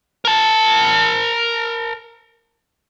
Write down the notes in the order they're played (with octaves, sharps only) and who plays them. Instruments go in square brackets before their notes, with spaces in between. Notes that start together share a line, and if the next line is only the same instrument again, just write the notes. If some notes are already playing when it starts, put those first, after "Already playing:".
[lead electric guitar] A#4 A5